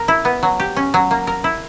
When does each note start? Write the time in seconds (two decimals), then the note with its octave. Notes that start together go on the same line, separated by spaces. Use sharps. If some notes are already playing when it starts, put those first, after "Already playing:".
Already playing: A#4
0.08 E4
0.25 B3
0.43 F#3
0.60 G4
0.76 C#4
0.94 F#3
1.11 A#3
1.27 A#4
1.44 E4